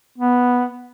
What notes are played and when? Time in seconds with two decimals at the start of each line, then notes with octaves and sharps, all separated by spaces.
0.18 B3